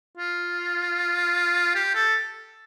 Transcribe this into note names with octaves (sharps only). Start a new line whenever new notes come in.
F4
G4
A4